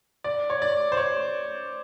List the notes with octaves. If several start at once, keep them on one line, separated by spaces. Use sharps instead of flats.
D5
C#5
D5
C5
C#5